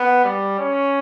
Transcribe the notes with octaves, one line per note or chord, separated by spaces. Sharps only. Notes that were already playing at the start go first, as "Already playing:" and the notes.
Already playing: B3
G3
C#4